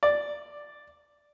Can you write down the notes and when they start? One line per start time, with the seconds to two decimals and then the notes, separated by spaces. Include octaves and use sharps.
0.03 D5